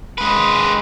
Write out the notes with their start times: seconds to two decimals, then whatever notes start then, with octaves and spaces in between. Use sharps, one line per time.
0.18 G#3 B4